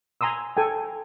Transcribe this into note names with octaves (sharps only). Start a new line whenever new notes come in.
G#5 A#5 C6 D#6 E6
A4 G5 G#5